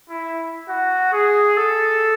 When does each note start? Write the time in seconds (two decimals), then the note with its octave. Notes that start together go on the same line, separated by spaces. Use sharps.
0.10 E4
0.69 F#4
1.12 G#4
1.57 A4